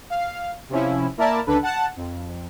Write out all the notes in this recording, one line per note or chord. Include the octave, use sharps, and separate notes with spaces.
F5
C3 F3 C#4 E4
A#3 E4 A#4 D5 E5 A5
C#2 D3 D4 A4 B4
F#5 A5
F2